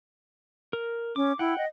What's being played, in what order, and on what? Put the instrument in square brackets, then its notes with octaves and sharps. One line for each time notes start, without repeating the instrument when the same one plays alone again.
[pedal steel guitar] A#4
[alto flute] C#4 [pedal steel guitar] D6
[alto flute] E4 [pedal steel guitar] F#5 G5
[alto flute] D#5